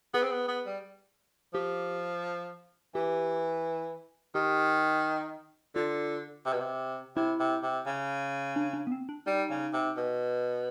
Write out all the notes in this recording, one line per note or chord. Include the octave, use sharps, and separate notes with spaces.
B3 G#4
C4
B3
B3
G3
F3 G4
E3 G4
D#3 G4
D3 F4
C3
B2
C3
C3 E4
C3
C3
C#3
D4
D4
B3
C4
D4
G3 D#4
C#3
C3
B2